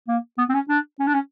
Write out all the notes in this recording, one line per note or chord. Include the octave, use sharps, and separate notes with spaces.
A#3
B3
C4
C#4
D4
C#4
D4
C#4